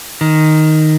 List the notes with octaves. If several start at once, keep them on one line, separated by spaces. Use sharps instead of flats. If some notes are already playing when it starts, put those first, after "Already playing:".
D#3